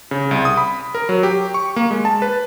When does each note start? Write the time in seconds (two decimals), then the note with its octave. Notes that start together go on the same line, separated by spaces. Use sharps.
0.11 C#3
0.31 C2
0.45 D#6
0.57 B5
0.95 A#4
1.09 F#3
1.23 G4
1.54 C#6
1.76 A#3
1.91 G#3
2.05 A5
2.22 B4